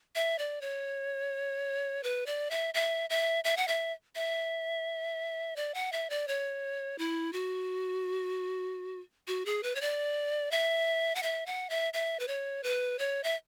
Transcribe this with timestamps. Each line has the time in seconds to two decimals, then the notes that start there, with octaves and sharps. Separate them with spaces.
0.15 E5
0.38 D5
0.61 C#5
2.03 B4
2.26 D5
2.51 E5
2.74 E5
3.10 E5
3.44 E5
3.57 F#5
3.68 E5
4.15 E5
5.56 D5
5.74 F#5
5.92 E5
6.10 D5
6.28 C#5
6.98 E4
7.33 F#4
9.28 F#4
9.46 G#4
9.63 B4
9.75 C#5
9.81 D5
10.51 E5
11.15 F#5
11.23 E5
11.46 F#5
11.70 E5
11.93 E5
12.20 B4
12.28 C#5
12.63 B4
12.99 C#5
13.24 E5